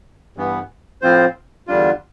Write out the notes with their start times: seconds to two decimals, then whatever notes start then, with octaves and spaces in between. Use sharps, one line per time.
0.37 G2 E3 B3
1.02 A2 F3 C4 F4 C5
1.67 E2 D3 G3 D4 F4